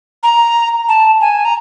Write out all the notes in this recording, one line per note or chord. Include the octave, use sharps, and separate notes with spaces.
A#5
A5
G#5
A#5